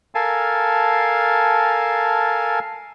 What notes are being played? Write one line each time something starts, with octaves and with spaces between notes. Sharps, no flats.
A4 A#4 F5 G#5 A5